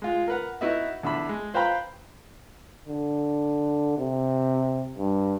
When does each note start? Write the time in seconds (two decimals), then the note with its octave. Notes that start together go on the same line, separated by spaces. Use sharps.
0.02 G#3 F4
0.28 A#4 B4 F#5
0.61 D#4 E4 F#4 B4 D#5 E5
1.03 E2 D3 E5 B5
1.29 G#3
1.54 B4 C5 F5 G5 A#5 B5
2.88 D3
3.98 C3
4.98 G2